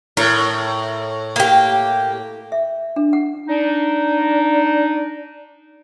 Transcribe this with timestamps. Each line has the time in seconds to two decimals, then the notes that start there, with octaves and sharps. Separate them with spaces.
0.17 A2 A#4
1.36 A#3 G4
2.52 E5
2.96 D4
3.13 F#5
3.48 D4 D#4